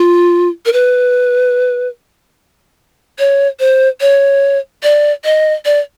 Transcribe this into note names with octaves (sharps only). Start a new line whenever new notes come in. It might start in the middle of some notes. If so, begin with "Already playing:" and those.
Already playing: F4
A#4
B4
C#5
C5
C#5
D5
D#5
D5